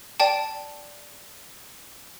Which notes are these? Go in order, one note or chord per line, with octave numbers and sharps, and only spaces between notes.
D5 G5 A5